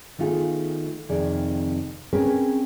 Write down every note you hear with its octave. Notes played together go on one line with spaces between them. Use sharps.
D#3 A3 B3 F4 G#4
F2 C3 D#3 G#4 D5
C4 C#4 G#4 A#4 B4